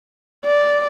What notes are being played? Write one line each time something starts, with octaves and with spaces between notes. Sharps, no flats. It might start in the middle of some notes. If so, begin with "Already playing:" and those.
D5